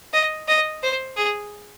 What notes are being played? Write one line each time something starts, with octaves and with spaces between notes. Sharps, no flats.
D#5
D#5
C5
G#4